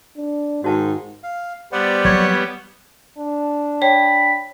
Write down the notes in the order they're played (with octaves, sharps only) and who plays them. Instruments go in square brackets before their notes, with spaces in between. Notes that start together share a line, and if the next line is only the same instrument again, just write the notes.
[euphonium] D4
[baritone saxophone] G#2 [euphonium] D#3 [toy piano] F#4 A5
[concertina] F5
[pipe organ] G3 B3 [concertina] C5 D5 F#5
[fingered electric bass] F3 F#3 A#3 [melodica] C#5
[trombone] D4
[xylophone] C#5 [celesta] G5 [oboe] B5